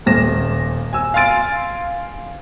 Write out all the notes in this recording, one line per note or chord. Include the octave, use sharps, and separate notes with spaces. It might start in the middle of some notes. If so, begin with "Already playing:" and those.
D#1 A#2 A#6 E7
G#5 E6
F5 G#5 C6 A6 D7